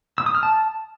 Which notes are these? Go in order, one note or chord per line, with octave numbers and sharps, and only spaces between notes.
E6
D#6
F6
A5